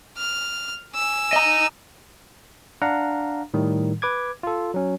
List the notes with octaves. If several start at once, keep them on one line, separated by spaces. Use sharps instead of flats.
F6
G#5 E6
D#5 A#5
D4 F5 F#5 A#5
A2 D#3 G3
B4 D6 G#6
F4 A4
F#3 C#4